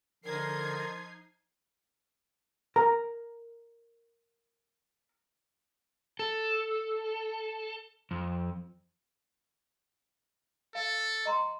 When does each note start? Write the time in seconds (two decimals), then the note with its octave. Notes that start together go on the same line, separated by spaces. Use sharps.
0.24 D3 F3 D#4 A#4 G#6 C7
2.76 A#4 A#5
6.19 A4
8.11 F2
10.75 A4 F5
11.26 D#5 A#5 C6